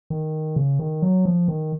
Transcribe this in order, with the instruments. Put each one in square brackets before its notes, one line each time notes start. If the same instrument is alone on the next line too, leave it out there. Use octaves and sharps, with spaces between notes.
[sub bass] D#3
C#3
D#3
F#3
F3
D#3